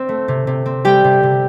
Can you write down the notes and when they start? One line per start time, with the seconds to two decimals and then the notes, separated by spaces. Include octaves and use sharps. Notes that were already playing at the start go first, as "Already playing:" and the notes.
Already playing: C4 C5
0.09 A3
0.28 C3
0.47 C3
0.66 C4
0.85 G3 G4 G5
1.04 C3
1.23 C3